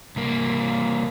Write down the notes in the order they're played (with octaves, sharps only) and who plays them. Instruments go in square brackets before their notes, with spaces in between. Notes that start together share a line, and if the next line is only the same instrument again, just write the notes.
[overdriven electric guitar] C2 A#3